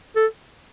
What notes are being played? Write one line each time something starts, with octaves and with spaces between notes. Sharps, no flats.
A4